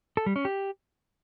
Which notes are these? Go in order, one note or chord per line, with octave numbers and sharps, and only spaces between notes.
A4
G3
C#4
G4